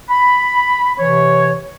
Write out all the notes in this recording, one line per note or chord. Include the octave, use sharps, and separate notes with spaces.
B5
C3 E3 C#5